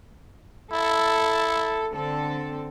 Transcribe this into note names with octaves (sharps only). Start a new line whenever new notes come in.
E4 A4
D3 C4 A4